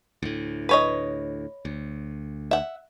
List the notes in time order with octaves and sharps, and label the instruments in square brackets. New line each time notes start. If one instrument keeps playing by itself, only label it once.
[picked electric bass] D2 A2
[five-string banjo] B4 C#5 D#5
[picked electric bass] D2
[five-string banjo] E5 F#5